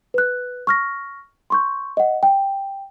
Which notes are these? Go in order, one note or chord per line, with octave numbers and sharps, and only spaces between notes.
B4 F#6
C#6 F6 A#6
C6 C#6 G6
D#5 F#5
G5